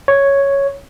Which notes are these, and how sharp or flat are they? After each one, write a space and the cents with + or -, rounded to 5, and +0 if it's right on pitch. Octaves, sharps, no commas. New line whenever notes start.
C#5 +0